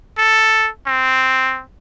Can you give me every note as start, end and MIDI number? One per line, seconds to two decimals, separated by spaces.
0.18 0.69 69
0.87 1.62 60